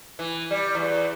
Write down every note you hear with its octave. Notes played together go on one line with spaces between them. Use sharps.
E3
G3
E2